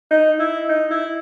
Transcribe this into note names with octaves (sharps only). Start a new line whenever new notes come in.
D#4
E4
D#4
E4